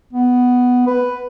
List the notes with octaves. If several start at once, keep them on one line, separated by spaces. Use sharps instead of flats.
B3
B4